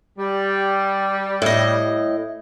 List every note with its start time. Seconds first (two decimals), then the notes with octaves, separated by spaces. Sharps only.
0.18 G3
1.42 A2 D#5